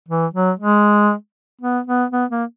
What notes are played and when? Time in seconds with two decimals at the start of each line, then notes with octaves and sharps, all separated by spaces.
0.08 E3
0.34 F#3
0.59 G#3
1.61 B3
1.87 B3
2.12 B3
2.31 A#3